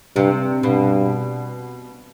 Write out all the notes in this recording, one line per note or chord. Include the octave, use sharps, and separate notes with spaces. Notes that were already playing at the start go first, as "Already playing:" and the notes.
G2 C3
G2 B2